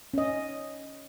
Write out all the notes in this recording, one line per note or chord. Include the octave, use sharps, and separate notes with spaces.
C#4 D#5